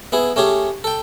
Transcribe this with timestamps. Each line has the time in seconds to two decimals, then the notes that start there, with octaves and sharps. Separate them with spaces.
0.12 B3 E4 G#4
0.36 A3 C#4 G4 G#4
0.84 A4 G5